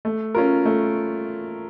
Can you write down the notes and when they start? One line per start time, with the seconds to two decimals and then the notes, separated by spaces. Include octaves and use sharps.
0.05 A3
0.35 C#4 F4 A#4
0.65 A3